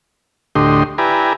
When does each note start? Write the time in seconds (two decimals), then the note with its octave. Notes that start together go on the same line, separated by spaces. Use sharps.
0.55 D2 A2 D3 G4 D#5 C6
0.98 E4 G4 B4 D5 G#5 A#5